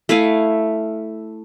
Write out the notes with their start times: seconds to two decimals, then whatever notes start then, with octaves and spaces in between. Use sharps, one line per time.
0.09 A3 E4 F5 G#5